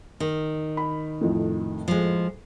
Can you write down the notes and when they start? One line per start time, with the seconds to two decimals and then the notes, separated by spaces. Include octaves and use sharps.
0.20 D#3
0.77 B5
1.21 F2 A2
1.88 F3 G#3